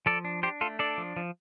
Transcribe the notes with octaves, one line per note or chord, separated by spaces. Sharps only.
F3 A4 D5
D4
D4 G4 C5
A3 F4 A4
D4 A4 D5
F3
F3